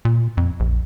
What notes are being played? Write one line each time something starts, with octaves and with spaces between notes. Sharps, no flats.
A#2
F2
A#1